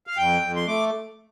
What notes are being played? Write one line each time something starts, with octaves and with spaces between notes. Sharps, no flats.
F5
F2 G5
F2
C6
A3 D6